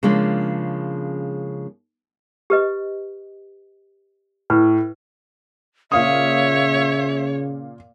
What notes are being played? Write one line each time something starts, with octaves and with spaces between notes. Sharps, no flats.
C#3 F3 G#3 A#3 C#4 D4
G4 B4 D#5
A2 B4
A#2 C#3 C#5 E5 F5 D#6